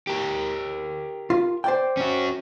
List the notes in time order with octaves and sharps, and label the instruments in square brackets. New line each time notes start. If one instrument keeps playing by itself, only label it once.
[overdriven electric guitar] G4 A#4
[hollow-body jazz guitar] F4
C5 D5 G5
[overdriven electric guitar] C#4 F#4